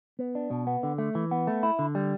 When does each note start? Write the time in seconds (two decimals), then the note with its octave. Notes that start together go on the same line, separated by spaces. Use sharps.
0.19 B3
0.35 D4
0.51 B2
0.67 B3
0.83 D3
0.98 A3
1.15 E3
1.31 B3
1.47 A3
1.63 E4
1.79 D3
1.95 G3